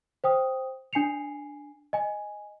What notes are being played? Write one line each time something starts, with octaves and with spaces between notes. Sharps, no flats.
C5 G5 D#6
D4 G#5 C7 C#7 F7
D#5 G#5